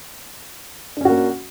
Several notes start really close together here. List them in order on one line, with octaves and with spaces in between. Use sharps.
D4 C#4 F#4 A#3